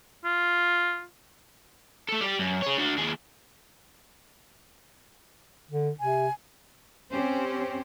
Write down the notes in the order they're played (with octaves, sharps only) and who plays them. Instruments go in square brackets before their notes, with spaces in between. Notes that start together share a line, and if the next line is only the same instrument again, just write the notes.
[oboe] F4
[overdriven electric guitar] A3 A4
G4 D5
F#2
G#4 C#5
D4 F#4
D#2 G#4
[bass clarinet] D3
[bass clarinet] C3 [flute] G#5
[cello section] C4 C#4 G4 C5